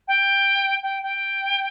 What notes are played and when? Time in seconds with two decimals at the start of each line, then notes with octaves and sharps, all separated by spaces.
0.08 G5
0.82 G5
1.02 G5